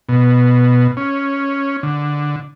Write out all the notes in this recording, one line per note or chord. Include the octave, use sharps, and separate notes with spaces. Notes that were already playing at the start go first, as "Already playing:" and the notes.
B2
C#4
D3